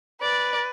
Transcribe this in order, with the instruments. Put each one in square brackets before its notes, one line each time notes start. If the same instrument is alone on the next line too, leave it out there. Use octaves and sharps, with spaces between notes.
[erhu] B4 [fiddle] D5